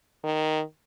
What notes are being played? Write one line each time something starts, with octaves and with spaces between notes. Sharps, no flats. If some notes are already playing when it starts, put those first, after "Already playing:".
D#3